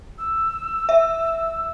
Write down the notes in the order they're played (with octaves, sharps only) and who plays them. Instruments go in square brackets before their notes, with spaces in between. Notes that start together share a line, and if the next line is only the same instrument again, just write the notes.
[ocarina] E6
[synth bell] E5